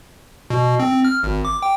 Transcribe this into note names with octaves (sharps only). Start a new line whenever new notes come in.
B2
C4
F6
G#1
D6
G5